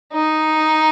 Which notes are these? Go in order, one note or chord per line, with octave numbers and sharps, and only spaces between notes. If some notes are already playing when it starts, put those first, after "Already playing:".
D#4